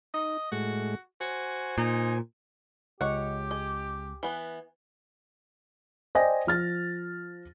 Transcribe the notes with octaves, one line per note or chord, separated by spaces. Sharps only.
D#4 D#5
A2 G#3 F#4
F#4 C5 G#5
A#2 D#4
C#2 G4 G#4 C#5 D#5 F#5
G#4 D#5
E3 B3
C5 D5 D#5 G5 G#5 A#6
F3 F6 A6